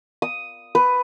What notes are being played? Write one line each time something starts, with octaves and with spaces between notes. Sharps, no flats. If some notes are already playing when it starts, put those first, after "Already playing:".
D#6
B4